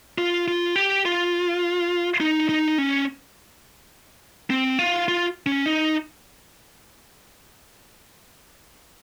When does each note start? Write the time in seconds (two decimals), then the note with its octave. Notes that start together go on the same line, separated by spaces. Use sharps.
0.18 F4
0.48 F4
0.76 G4
1.05 F4
2.20 D#4
2.49 D#4
2.78 C#4
4.50 C4
4.79 F4
5.08 F4
5.46 C#4
5.66 D#4